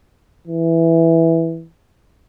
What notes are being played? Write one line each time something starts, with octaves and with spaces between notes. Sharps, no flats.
E3